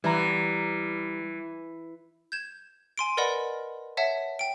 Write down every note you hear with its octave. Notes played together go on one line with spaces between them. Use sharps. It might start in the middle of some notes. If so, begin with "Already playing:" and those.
E3 G3 A#5
G6 G#6 E7
G#5 C6 D7
A#4 B4 D5 D#5 F#5 B5
C#5 E5 F#5 A5
G5 D7